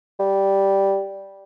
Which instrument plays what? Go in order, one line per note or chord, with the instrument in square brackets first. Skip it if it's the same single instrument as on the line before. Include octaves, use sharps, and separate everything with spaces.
[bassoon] G3